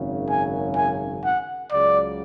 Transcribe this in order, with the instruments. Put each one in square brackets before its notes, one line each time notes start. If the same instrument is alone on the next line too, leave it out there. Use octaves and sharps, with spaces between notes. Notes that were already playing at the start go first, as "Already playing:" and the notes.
Already playing: [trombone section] G#1 F#2 C#3
[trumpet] G#5
G#5
F#5
[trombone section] C#2 C#3 F#3 [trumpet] D5